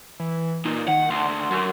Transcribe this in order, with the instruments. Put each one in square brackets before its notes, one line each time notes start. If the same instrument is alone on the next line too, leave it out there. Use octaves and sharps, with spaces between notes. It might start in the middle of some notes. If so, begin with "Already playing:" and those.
[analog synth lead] E3
[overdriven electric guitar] A#2 [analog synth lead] D#4
[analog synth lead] D#3 [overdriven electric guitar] F#5
[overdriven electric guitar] D2 [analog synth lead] C6
[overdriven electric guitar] F#2